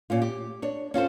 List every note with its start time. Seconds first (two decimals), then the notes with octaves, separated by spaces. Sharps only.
0.10 A#2 C#4 F4
0.22 G4
0.62 D4 C#5
0.94 C#4 F4 A4 C5